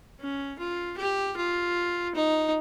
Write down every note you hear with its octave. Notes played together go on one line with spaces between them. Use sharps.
C#4
F4
G4
F4
D#4